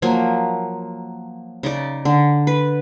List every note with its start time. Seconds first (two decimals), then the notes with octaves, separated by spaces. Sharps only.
0.02 F3 F#3 A#3
1.63 C#3 D#4 D5
2.05 D3
2.47 B4